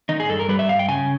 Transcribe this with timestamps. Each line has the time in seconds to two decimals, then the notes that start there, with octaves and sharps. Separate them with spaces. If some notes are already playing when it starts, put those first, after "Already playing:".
0.09 D#3 D#4
0.20 G#4
0.30 G2 A4
0.39 A#4
0.49 G3 B4
0.59 E5
0.69 G2 F5
0.79 G5
0.88 C#3 G#5